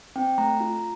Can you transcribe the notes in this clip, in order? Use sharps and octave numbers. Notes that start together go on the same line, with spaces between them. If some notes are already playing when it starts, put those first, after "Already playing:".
C4 G5
A3 A#5
F4